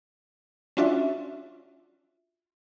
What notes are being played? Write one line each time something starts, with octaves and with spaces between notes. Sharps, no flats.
C#4 D4 F4 F#4 D5 E5